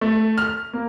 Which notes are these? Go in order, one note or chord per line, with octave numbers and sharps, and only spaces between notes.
A3
F6
A#3